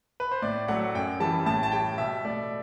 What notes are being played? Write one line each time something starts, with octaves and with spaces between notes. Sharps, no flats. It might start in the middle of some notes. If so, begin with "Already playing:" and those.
B4
C5
A2 D5
F#3 A3 F#5
F#2 G5
E3 G3 A5
A2 A5
A5
G3 G5
B2 E5
A3 D5